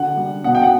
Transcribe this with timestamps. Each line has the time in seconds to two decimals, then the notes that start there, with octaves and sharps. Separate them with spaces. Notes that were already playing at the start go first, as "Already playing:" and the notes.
Already playing: D3 F#5
0.17 G3
0.44 B2 F#5
0.55 G5
0.63 F#5